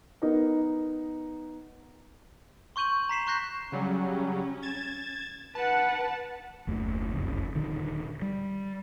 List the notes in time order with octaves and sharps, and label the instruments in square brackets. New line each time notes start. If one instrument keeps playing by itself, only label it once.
[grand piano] B3 D#4 A#4
[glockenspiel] C6 C#6 G6 D#7 F#7
A#5 B6 C7 E7
C6 C#6 F#6 G6 A#6 C7
[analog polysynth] C#3 F#3 G3 [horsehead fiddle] C#4
[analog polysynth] G#6 A6 E7
[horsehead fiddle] B4 F#5 [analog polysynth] A5
[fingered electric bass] F#1 D#2 A3
F#1 C2 F2 C#3
D#1 A#2 D3 D#3
G3